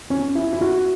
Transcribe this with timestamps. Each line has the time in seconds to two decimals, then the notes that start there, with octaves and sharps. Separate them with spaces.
0.10 C#4
0.35 E4
0.53 E4
0.61 F#4